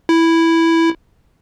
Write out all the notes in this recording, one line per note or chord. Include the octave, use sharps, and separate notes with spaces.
E4